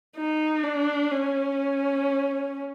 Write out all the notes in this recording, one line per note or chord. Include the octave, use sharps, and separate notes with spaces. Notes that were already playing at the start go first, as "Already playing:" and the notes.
D#4
D4
C#4